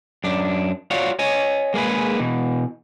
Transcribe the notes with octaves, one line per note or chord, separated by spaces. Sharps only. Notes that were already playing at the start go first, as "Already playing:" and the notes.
F#2 D4
F4 F#4 C#5 D5 F5
C#5 D#5 G#5
G#3 A#3 G#4 B4
B2 E3